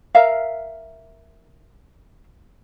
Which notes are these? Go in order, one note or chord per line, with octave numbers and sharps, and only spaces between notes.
A#4 E5 F5